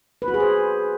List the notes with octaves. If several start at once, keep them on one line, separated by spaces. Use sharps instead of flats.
B4
F#4
G#4
C5